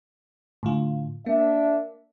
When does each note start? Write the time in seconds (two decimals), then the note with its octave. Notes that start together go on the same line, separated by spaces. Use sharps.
0.63 A2 D3 F4
1.26 A#3 D4 E5